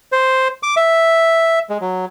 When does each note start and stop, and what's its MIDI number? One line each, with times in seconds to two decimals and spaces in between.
0.12 0.48 72
0.63 0.75 86
0.77 1.59 76
1.70 1.78 56
1.81 2.05 54